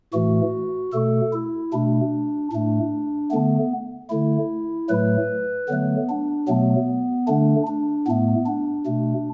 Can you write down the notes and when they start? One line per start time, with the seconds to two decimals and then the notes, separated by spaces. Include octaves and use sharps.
0.13 A2 E3 A3 F#4
0.93 B2 A3 A4
1.33 E4
1.73 B2 A3 D4
2.52 A2 A3 D4
3.31 D3 A3 B3
4.10 D3 A3 E4
4.89 A2 F#3 A3 B4
5.68 D3 F#3 A3 B3
6.09 D4
6.48 B2 F#3 A3 B3
7.27 D3 A3 D4
7.67 D4
8.07 A2 A3 B3
8.46 D4
8.86 B2 A3